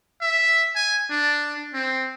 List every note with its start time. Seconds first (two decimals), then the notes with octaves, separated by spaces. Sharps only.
0.21 E5
0.75 G#5
1.10 D4
1.74 C4